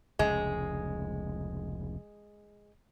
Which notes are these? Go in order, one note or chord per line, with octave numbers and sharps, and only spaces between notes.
F1 C#2 G#3